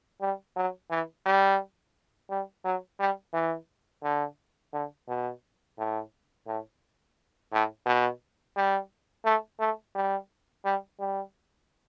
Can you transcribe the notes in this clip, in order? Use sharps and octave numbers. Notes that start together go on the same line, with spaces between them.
G3
F#3
E3
G3
G3
F#3
G3
E3
D3
D3
B2
A2
A2
A2
B2
G3
A3
A3
G3
G3
G3